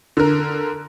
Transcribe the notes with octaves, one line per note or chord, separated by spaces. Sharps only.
D3 A#4